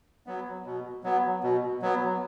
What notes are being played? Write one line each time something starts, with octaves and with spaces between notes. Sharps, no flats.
F#3 B3
B2
F#3 B3
B2
F#3 B3